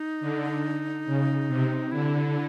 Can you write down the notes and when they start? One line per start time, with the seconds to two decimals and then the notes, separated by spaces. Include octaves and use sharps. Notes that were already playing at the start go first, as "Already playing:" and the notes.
Already playing: D#4
0.21 D3
1.06 C#3
1.48 C3
1.91 D3 E4